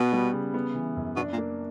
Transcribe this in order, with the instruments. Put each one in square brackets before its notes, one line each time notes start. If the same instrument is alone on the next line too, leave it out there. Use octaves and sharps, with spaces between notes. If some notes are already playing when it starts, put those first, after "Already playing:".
Already playing: [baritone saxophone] B2 [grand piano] B3
[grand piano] G3
C#3
B3
E3
F#2
[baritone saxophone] B2 [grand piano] D4
[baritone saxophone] A#2
[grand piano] A#3